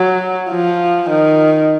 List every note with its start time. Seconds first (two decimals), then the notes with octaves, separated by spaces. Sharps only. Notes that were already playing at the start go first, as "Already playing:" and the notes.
Already playing: F#3
0.50 F3
1.10 D#3